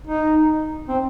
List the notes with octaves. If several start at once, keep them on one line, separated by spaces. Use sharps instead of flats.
D#4
C4